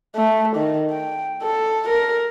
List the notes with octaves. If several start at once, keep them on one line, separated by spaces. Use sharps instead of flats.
A3
D#3
G5
A4
A#4